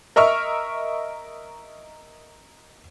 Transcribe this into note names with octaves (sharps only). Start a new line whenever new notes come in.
A#4 D#5 E5 C#6 F6